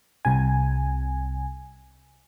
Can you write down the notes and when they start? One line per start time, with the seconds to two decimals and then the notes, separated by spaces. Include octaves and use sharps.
0.25 C2 C3 G#5